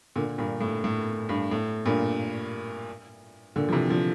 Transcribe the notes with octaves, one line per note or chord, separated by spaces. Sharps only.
A#2 D3
G2 A#2
A2
A2
G2
A2
G2 A#2
A#2 D3
F3
C3 E3
D3 F3